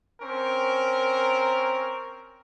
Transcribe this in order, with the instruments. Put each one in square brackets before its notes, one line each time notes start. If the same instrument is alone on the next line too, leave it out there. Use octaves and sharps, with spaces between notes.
[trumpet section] C4 C#4 A#4